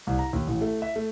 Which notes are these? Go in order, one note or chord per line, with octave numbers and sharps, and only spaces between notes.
C2
A#5
D#2
A1
A3
E5
A3